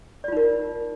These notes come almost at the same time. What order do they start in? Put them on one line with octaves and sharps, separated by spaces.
D5 F4 D#4 A#4